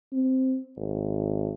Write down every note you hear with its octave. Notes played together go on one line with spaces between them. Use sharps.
C4
G#1